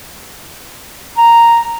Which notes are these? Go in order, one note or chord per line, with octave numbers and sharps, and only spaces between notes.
A#5